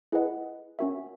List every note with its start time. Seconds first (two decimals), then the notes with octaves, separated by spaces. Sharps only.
0.12 E4 G#4 B4 D#5 F#5
0.79 C#4 F#4 A#4 E5